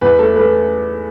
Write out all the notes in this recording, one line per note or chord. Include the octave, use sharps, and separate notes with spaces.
E2 B4
A3 A4
A3 B4